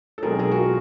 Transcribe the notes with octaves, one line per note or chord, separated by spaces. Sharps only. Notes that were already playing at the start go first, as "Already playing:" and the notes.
A4
B1 B2 G#3 C4 G#4 A#4
G#4 A#4
F#4
F4